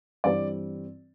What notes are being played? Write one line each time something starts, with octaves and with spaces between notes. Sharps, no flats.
G2 E3 G3 C4 D5